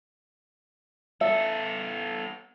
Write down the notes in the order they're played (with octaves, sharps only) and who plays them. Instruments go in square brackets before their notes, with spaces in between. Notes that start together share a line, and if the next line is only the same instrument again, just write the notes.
[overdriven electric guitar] B3 A4 [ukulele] E5